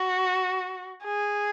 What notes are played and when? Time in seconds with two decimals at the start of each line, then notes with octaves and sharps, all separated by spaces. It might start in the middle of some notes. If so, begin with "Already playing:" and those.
Already playing: F#4
1.04 G#4